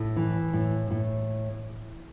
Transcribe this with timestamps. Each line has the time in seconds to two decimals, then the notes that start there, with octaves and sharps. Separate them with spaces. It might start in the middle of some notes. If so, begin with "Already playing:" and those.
Already playing: A2
0.16 E3
0.53 A2
0.91 A2